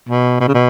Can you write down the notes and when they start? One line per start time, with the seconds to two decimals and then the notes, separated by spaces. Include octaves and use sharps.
0.09 B2
0.40 B2
0.48 C#3
0.54 B2